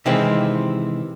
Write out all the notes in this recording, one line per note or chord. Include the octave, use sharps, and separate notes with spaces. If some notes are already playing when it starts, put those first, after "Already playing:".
C3 D#3 E3 G#3 C4